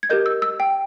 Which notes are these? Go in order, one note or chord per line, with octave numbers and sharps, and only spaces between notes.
G#6
G4 A#4 D#5 G6
E6
E6
G5